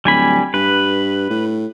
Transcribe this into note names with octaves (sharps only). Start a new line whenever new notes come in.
D1 G3 G#5 B5
G2 B4
A2